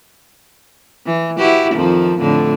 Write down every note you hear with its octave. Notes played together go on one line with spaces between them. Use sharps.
E3
E4 F#4 G4
F2 D#3 F3
F2 A2 D3